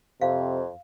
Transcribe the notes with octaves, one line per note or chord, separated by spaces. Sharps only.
F2 C3 F5